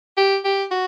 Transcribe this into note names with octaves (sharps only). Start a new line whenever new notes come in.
G4
G4
F#4